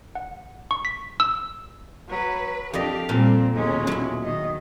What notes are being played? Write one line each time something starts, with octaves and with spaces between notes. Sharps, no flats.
F#5
C#6
B6
E6
F#3 B4
F2 D4 G4 D5 D#5 F5
A#2 G3 C4 A4
D#2 B2 G#3 C#4
F#3 E4
D#3 D#5